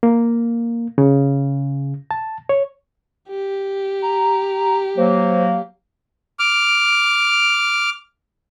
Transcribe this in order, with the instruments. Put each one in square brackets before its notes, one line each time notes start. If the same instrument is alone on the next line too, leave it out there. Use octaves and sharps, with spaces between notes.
[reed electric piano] A#3
C#3
A5
C#5
[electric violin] G4
[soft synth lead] A#5
[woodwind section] F#3 A#3 [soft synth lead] C5
[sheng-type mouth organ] D6 F6